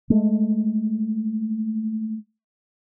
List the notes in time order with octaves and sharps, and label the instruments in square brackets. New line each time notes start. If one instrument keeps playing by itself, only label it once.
[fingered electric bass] G#3 A3